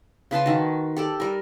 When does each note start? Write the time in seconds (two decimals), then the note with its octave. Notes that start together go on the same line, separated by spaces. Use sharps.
0.31 C#3 B4 A5 C6
0.46 D#3 F#4
0.96 G4 A4 D5
1.20 G3 A#4